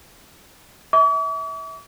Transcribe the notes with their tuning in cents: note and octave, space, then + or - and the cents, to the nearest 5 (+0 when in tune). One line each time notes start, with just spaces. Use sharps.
E5 -30 D6 -45